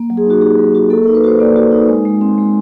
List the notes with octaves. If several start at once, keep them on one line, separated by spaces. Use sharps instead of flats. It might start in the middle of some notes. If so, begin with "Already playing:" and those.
Already playing: A#3
F#3
G#4
D#4 F#4
D#4 G4
F#3
F#4
A#3 A4
A#4
D#4
B4
F#4 C5
A#3 D5
F#4
D#4
G#3
G#3
C4
G#3